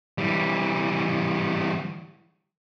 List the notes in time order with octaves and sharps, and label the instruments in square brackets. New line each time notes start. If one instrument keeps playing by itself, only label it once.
[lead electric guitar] E3 G3